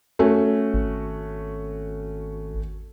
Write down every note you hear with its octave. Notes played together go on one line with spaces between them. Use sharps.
A3 C#4 F#4
G#1